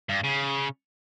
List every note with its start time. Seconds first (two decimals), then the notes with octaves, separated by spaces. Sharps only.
0.09 G2
0.24 C#3